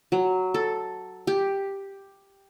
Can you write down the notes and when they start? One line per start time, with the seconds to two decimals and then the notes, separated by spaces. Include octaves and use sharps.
0.12 F#3
0.54 A4
1.27 G4